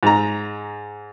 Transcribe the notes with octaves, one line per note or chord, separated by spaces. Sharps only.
G#2 A#5